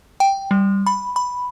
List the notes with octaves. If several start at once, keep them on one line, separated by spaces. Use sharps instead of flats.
G5
G3
B5
B5